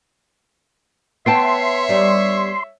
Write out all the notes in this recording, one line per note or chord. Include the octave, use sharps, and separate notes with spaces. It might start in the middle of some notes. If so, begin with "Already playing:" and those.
B3 C#5 E5 G5 A5 C6
G3 D4 D#4